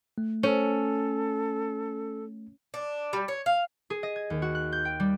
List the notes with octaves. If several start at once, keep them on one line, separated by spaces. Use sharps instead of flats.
A3
C#4 A4
D4
G3
C#5
F5
G#4
D#5
G#6
D#2
F#4
F#6
G6
G5
G3